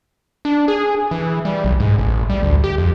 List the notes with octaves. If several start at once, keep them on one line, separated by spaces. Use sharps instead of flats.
D4
G#4
E3
G3
B1
G#2
A1
G3
D2
G4
F2